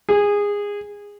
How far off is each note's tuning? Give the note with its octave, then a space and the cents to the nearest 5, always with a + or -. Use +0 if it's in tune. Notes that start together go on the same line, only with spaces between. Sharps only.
G#4 -20